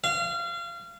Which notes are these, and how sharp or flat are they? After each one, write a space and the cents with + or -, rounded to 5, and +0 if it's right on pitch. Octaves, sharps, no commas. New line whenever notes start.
F5 -30